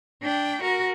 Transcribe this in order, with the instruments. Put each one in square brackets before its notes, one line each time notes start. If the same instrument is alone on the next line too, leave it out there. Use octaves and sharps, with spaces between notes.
[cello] D4 G5
F#4 A#4